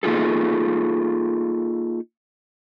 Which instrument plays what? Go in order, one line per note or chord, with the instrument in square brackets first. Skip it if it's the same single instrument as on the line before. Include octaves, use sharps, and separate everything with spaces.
[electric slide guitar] A#3 D#4 F4 G#4 A4